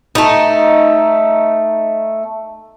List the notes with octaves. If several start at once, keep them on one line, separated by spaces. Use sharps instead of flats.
A3 D#4